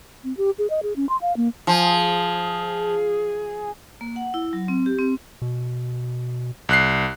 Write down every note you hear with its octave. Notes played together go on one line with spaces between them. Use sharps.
C4
G4
G#4
D#5
G#4
C#4
C6
F5
A#3
F3 G#4
A#3
F#5
E4
F#3
C4
G4
C4
B2
C2 F#6 C7